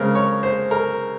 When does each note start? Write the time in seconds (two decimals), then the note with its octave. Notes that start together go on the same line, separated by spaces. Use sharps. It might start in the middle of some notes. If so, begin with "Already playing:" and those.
Already playing: C#3 G#3 C4 A#4
0.15 C#5
0.43 C5
0.71 A#4